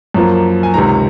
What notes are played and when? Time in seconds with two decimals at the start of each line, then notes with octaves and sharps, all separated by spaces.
0.14 F#2 F3 A#3
0.63 G#5
0.74 C#2 C3 D#3 A#5